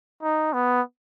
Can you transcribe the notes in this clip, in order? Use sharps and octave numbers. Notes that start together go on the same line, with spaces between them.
D#4
B3